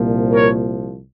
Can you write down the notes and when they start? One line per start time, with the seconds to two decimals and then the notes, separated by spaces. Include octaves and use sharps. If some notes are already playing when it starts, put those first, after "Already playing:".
Already playing: C2 A#2 F3
0.32 A#4 C#5